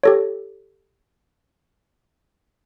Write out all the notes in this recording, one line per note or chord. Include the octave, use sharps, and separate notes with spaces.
G4 A4 C#5